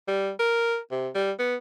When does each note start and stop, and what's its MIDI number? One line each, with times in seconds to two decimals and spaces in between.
0.08 0.31 55
0.39 0.78 70
0.91 1.09 48
1.15 1.32 55
1.39 1.56 59